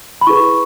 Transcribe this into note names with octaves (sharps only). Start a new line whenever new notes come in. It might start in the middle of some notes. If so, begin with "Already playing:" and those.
B5
E4 G#4 B4 C#6